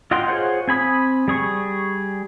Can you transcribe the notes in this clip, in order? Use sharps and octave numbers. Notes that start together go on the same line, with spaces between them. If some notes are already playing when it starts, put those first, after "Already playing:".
F4 D#5 F#5 G5 C6
F4 G#4 C5 C#5 F#5
C4 G#5 B5 D#6
G3 G#4 C#6